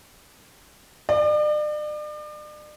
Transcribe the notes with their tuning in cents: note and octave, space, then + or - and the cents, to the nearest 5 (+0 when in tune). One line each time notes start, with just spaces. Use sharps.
D5 +40